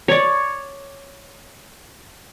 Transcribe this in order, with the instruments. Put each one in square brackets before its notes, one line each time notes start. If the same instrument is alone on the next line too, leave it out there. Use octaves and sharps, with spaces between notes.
[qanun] C#5 D5